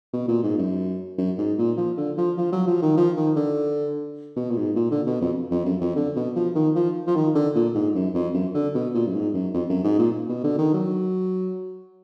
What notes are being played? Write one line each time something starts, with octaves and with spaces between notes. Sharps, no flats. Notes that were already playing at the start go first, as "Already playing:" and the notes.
B2
A#2
G#2
F#2
F#2
G#2
A#2
F3
D3
F3
F3
F#3
F3
D#3
F3
D#3
D3
B2
A#2
G#2
A#2
D3
B2
F2
F2
F#2
F2
D3
B2
F3
D#3
F3
F3
D#3
D3
A#2
G#2
F#2
F2
F#2
D3
B2
A#2
F#2
G#2
F#2
F2
F#2
G#2
A#2
B2
D3
D#3
F#3